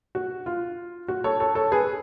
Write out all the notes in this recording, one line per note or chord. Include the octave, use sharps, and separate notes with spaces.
F#4
F4
F#4
A4 C#5
A4 C#5
A4 C#5
G#4 B4